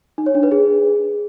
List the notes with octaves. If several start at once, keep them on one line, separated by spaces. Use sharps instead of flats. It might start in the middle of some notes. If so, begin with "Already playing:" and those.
D#4
C#5
D4
B4
G#4